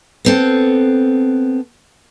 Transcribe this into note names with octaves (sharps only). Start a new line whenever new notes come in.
B3 C4 A4